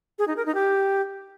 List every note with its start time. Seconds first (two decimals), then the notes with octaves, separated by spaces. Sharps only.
0.19 G#4
0.28 D#4
0.37 A#4
0.46 D#4
0.55 G4